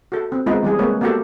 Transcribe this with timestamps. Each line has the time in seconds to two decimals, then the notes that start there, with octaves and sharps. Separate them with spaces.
0.12 F#4 A4
0.32 C4
0.46 G#3 B3 C4 D#4 F4
0.63 E3 G3 G#4
0.79 G#3 A#3 C4 B4 C#5
1.01 A#3 B3 F#4 G4 A4